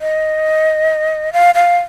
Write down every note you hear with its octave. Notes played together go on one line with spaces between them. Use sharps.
D#5
F5
F5